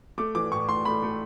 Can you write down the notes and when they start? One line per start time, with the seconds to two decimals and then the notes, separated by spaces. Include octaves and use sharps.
0.18 A3 D6
0.35 E3 D6
0.52 A2 C#6
0.69 A2 C6
0.85 A3 B5
1.03 A3